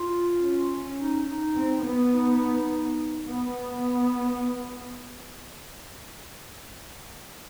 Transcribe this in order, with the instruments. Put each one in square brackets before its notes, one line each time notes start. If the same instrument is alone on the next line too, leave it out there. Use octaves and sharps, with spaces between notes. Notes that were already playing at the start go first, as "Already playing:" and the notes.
Already playing: [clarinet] F4
[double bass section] C#4
[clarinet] D#4
D#4
[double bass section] C4
B3
[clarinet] D#4
[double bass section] B3